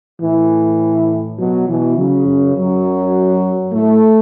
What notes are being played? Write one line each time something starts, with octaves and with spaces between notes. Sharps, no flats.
A2 E3
B2 F#3
B2 E3
C#3 F#3
F#2
F#2 F#3
A2 A3